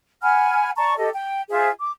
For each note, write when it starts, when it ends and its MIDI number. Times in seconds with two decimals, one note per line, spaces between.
0.22 0.71 78
0.22 0.71 80
0.22 0.71 83
0.22 0.71 89
0.77 0.94 74
0.77 0.94 81
0.77 0.94 82
0.77 0.94 85
0.98 1.09 67
0.98 1.09 69
0.98 1.09 75
1.15 1.41 79
1.50 1.69 65
1.50 1.69 68
1.50 1.69 72
1.50 1.69 76
1.80 1.91 86